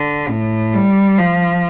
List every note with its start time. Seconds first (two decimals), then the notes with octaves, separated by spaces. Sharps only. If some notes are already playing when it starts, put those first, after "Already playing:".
Already playing: D3
0.29 A2
0.74 G3
1.18 F3